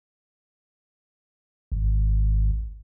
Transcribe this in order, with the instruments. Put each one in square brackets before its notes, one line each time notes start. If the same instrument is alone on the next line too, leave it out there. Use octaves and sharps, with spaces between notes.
[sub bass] G#1